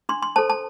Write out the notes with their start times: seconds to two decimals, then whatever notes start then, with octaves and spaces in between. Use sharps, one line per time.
0.09 D4 C6
0.23 C6
0.36 A4 C5 A5
0.50 A5